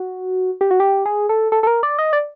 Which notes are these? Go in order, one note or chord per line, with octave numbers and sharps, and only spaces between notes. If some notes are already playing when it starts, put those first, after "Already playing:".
Already playing: F#4
G4
F#4
G4
G#4
A4
A4
A4
A#4
D5
D#5
D5